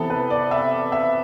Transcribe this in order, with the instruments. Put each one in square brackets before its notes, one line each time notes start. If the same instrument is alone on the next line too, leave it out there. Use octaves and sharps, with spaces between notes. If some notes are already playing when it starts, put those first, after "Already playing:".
Already playing: [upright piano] C3 E3 B3 A4
B4
D5
E5
E5